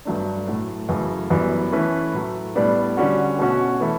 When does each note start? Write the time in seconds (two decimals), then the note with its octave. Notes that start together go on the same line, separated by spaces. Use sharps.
0.05 G2 F#3 A3 D4
0.47 A2 F#3 A3
0.89 F#2 C#3 E3 A3
1.30 F#2 E3 G3 B3
1.72 E3 A3 C#4 E4 B4
2.13 A2 F#3 A3
2.55 A2 G3 B3 D4
2.97 D3 G3 C#4 F#4
3.39 B2 A3 C#4 F#4
3.80 E3 A3 E4 A4